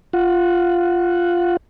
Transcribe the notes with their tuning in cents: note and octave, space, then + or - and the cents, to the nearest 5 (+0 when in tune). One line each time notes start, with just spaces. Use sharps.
F4 -5 F#5 +0